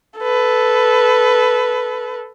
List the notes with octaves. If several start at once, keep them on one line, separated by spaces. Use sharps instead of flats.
A4 B4